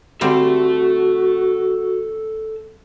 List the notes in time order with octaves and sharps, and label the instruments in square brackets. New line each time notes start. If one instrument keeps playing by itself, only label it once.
[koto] D3 G3 C4 [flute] F#4 [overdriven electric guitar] A4 E5